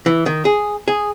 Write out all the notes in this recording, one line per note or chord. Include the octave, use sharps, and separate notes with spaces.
E3
D#3
G#4
G#4